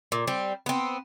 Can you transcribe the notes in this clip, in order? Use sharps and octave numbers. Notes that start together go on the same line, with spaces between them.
A#2
G3 C4
B3 C4